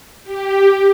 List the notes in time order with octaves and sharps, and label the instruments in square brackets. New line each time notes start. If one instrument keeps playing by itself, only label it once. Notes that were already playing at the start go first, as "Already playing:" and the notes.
[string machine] G4